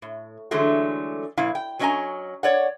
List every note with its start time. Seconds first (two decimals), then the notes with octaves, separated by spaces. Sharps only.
0.02 A2
0.51 D3 E3 F#3 G#3 A3
1.37 A#2 F3 E4 F5
1.55 G5
1.79 F#3 C#4 D4 D#5 G#5 A#5
2.43 C#5 D5 F#5